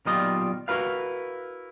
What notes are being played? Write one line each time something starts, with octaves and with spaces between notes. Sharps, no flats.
B1 A#2 D#3 G3 F4 D#5
E4 F#4 A#4 B4 F5